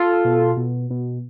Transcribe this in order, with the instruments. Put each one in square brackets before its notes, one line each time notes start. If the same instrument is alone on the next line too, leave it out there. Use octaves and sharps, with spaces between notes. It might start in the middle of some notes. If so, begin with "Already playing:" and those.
Already playing: [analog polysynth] F4 A4
B2
B2
B2